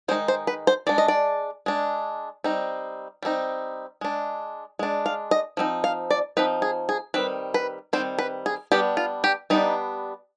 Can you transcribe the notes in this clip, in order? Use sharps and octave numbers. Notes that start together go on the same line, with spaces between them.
D#3 G#3 D#4 C5
C5
B4
C5
G#3 D4 D5
D#5
D5
G#3 D4
G3 C4 D#4
G3 C4 D#4
G#3 D4
G#3 D4
F5
D#5
F3 C4 D#4
F5
D5
F3 C4 D#4 B4
G#4
G#4
D#3 G3 C4 B4
B4
D#3 G3 C4 C5
B4
G#4
G3 B3 D4 G4
F4
G4
G3 B3 D4 D#4